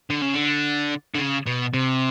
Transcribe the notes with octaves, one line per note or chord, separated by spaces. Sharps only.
D3
C#3
D3
D3
C#3
B2
C3